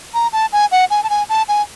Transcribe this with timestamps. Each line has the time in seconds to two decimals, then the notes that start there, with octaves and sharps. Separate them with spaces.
0.14 A#5
0.33 A5
0.52 G#5
0.71 F#5
0.90 G#5
1.03 A5
1.10 G#5
1.29 A5
1.48 G#5